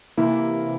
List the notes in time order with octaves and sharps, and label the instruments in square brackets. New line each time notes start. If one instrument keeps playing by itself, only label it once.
[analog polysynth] C3 E3 A#3 [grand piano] E4